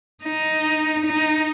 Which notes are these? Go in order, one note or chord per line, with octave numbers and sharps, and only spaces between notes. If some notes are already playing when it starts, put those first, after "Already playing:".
D#4
D#4